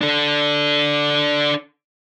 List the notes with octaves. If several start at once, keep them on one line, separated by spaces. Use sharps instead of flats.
D4 A4